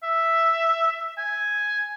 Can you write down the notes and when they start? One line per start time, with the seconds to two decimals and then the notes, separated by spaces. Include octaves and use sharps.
0.03 E5
1.18 G#5